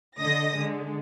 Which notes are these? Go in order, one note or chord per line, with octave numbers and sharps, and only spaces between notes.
D3 D#5 D#6 A#6
D3 G#3